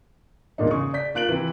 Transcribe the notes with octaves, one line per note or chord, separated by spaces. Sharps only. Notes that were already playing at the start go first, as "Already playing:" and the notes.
E2 A#2 G#3 A#3 D4 D#4
C#3 G#4 C#6
D5 G6 B6
A#3 F4 F#6 D7 F#7
C3 E3